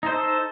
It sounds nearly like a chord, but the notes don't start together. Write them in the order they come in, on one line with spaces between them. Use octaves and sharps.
D#4 C5 A4